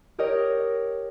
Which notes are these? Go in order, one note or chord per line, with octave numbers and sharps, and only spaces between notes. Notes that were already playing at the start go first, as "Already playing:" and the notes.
G4 A#4 C#5 D#5